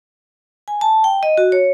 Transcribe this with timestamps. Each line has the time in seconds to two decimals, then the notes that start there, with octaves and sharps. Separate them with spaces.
0.68 G#5
0.81 A5
1.04 G5
1.23 D#5
1.38 F#4
1.52 C#5